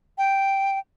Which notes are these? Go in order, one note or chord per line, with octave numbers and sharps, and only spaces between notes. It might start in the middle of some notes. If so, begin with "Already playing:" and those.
G5